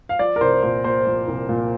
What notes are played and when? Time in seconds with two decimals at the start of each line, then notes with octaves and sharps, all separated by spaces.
0.09 F5
0.19 F3 D5
0.36 A#4
0.41 C2 C5
0.63 A#2 C5
0.84 A#3 C5
1.07 F3
1.27 C2
1.49 A#2